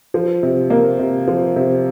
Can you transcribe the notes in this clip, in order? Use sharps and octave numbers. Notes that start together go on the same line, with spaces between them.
F3
C3
A#3
C3
F3
C3